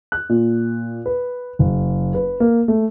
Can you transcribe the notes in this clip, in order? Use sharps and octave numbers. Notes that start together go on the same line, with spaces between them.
F#6
A#2
B4
F#1
B4
A#3
A3